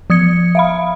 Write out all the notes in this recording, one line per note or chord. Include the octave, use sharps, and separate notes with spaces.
F3 D#6 G#6 C#7
E5 F5 B5